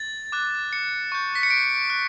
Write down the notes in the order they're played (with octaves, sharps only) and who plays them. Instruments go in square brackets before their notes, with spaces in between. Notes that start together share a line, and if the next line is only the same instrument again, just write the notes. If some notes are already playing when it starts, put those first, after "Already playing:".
Already playing: [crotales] A6
D6 F#6
C#7
C#6 G6
B6
C#7
D7
F#6